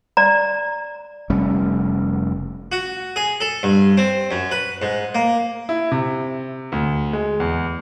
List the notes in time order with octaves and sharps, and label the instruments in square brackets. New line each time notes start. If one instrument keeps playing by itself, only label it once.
[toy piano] D5 A#5
[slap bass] F1 G3 A3 C#4
[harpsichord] F#4
G#4
A4
G2
C4
F#2
B4
G#2
A#3
[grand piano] E4
C3
D2
G#3
E2